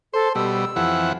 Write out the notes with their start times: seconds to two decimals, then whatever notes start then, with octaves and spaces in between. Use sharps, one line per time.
0.14 A4 C5
0.35 B2 G3 E6
0.76 F2 E3 F#5